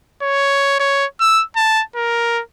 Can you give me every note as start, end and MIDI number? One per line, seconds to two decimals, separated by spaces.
0.22 0.77 73
0.80 1.05 73
1.20 1.44 88
1.56 1.83 81
1.96 2.41 70